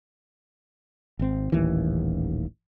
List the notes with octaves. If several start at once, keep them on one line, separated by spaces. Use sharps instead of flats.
G#1 C4
D#1 A1 D#2 E3